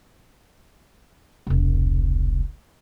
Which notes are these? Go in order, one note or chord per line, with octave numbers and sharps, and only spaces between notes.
E1 C2